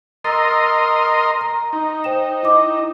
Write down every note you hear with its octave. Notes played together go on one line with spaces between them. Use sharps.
A#4 D#5 C6 E6 A6
A#5
D#4
C5 G5 E7
E4 D#5 D6